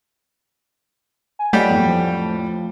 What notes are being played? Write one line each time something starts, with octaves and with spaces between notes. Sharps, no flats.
G#5
F#3 G3 A3 F4 G4 D#5 F#5
F2 A2
F3